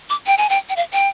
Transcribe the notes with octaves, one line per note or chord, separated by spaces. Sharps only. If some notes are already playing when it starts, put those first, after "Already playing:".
D6
G5
G#5
G5
G5
F5
G5